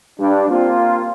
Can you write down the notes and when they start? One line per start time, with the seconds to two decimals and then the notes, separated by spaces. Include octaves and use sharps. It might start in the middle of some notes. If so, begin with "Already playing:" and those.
0.20 G2 D4
0.50 A#3 C4 F4